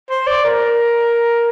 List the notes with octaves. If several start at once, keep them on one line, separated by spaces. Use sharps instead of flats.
C5
D5
A#4